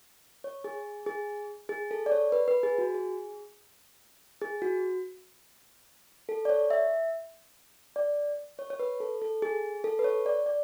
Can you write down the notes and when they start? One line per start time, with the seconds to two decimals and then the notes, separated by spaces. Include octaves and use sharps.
0.44 C#5
0.64 G#4
1.06 G#4
1.69 G#4
1.91 A4
2.06 D5
2.12 C#5
2.32 B4
2.48 B4
2.63 G#4
2.78 F#4
2.95 G#4
4.41 G#4
4.62 F#4
6.29 A4
6.45 D5
6.50 C#5
6.71 E5
7.96 D5
8.59 C#5
8.70 C#5
8.80 B4
9.00 A4
9.22 A4
9.42 G#4
9.84 A4
9.99 B4
10.04 C#5
10.26 D5
10.46 D5